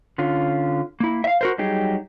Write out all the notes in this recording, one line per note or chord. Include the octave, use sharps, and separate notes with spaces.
D3 C#4 F4
A#3 E4
E5 F5
F#4 A#4 C5
F#3 G3 D#4 G4 G#4